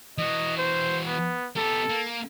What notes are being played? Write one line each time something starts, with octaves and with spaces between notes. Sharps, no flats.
E3 F#4 D#5
C5
B3
B3 G4 A4
A#3